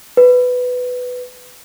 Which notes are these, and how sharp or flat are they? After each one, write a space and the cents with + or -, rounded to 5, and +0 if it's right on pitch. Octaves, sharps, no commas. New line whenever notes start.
B4 +10